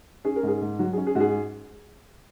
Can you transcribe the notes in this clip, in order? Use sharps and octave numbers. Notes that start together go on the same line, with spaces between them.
C#4 G#4
A#4
G#2 G#4
G#2
F#3 F#4
G#4
C#4
G#4
G#2 F#4
G#4